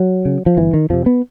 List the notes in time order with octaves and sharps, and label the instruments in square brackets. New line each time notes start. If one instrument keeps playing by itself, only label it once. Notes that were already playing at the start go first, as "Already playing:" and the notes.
Already playing: [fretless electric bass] F#3
C#3
F3
G1 E3
D#3
F2 C3 F3
B3